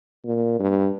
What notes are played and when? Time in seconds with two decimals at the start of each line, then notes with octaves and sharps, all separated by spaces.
0.25 A#2
0.59 G2